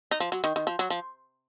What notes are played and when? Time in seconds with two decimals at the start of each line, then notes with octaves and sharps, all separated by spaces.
0.11 D#4
0.20 F3
0.32 F#3
0.44 D#3
0.56 D#3
0.67 F3
0.79 F#3
0.90 F3